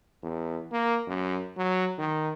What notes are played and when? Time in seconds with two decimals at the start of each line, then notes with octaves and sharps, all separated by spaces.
0.23 E2
0.72 A#3
1.07 F#2
1.57 F#3
1.98 D#3